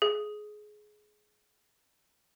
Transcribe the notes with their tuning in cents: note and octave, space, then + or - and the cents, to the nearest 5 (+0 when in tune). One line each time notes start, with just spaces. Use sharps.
G#4 +20